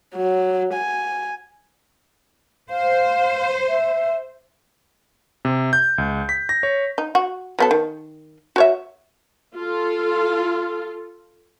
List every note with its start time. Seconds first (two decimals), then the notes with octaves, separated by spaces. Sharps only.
0.14 F#3
0.74 G#5
2.70 C5 F5
3.68 E5
5.45 C3
5.73 G6
5.98 C#2
6.29 B6
6.49 A#6
6.63 C#5
6.98 D#4
7.15 F#4
7.59 F#3 B3 A4
7.71 D#3
8.56 F#4 C#5 E5
9.57 F4 A4